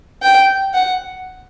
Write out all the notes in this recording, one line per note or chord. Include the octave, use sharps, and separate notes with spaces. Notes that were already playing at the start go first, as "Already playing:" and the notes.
G5
F#5